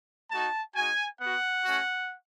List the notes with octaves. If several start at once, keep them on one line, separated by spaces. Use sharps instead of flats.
A3 D#4 F#4 A5
G#3 D#4 F#4 G#5
B3 F#4 F#5
A3 C#4 F#4